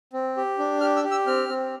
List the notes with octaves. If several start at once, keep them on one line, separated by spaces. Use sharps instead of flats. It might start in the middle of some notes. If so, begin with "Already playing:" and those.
C4
G4
D4
G4 F6
E6
G4
E6
C4 F6
C4